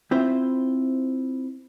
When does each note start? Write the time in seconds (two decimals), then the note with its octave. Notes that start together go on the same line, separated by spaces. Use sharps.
0.11 C4 E4 F4 C5